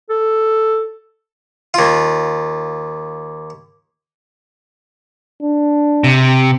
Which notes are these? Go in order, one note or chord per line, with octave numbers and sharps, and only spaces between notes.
A4
D#2 F4
D4
C3